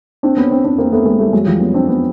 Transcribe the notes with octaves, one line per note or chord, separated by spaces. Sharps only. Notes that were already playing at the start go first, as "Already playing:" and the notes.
C4 D4
B3 C#4
C4 D4
C4 D4
A#3 C4
A3 B3
G#3 A#3
G3 A3
F#3 G#3
F3 G3
B3 C#4
C4 D4
B3 C#4